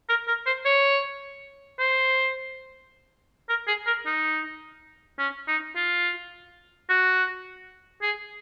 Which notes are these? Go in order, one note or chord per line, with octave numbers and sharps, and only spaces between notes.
A#4
A#4
C5
C#5
C5
A#4
G#4
A#4
D#4
C#4
D#4
F4
F#4
G#4